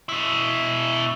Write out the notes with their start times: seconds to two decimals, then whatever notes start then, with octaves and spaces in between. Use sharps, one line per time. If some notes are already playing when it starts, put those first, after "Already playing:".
0.09 B2 E4